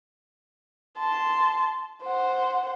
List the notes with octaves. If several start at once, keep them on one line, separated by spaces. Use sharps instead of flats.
A5 C6
C5 F#5